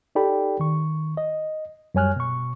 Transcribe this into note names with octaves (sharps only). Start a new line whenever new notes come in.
D#4 G4 A4 D5 G5 B5
D#3 C#6
D#5
F#2 G3 C#5 G#5 F6 F#6
B2 C#6